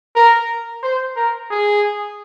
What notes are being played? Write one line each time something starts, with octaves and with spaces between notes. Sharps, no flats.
A#4
C5
A#4
G#4